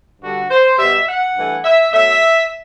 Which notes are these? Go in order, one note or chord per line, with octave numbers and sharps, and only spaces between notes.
G2 D3 G3 F#4
C5
B2 G3 E5
F#5
G2 E3 A3
E5
B2 F#3 A3 E5